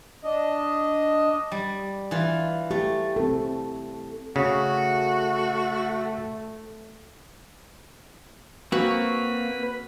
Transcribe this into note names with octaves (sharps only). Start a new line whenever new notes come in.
D4 D#5
G3
E3 F4
A3 G4
C4 A4
C#3 A3 F#4
A#3 C4 F#4 B4